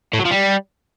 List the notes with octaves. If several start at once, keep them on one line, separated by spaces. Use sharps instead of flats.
A2
F#3
F3
G3